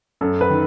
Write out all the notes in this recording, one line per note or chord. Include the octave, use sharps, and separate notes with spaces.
F#2 A4
B4
D#3